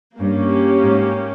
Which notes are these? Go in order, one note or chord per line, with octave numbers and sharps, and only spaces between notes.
G2 A#3 C#4 G4
G#2